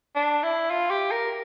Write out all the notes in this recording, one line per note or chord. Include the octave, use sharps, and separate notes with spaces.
D4
E4
F4
G4
A#4